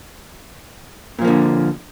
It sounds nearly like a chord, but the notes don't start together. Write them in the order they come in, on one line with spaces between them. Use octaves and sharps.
A#2 F3 A#3 D3